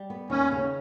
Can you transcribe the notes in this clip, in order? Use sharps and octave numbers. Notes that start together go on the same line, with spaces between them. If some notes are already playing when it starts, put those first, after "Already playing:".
Already playing: G3
B3
D#2 C#4
C#3